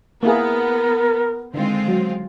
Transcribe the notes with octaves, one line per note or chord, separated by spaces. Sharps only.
A#3 B3 E4 G#4 A#4
D3 D#3 G#3 C4 F4
F#3